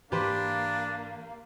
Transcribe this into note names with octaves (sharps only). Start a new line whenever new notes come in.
G#2 E3 A#3 D4 G4 B4 C5